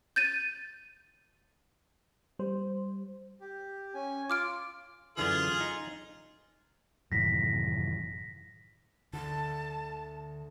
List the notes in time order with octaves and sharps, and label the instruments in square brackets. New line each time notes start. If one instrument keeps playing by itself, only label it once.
[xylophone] G6 A6 D#7
[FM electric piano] G3 C5
[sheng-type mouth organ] G4
C#4 G#5
[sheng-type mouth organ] F4 [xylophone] D6 F6 D7
[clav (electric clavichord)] F#2 D3 E3 [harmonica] F4 G#4
[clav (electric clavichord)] D#4
[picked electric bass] F#2 D#3 E3 [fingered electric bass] A2 C3 F#3 [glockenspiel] A#6 B6
[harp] D2 [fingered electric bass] D3 [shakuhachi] A5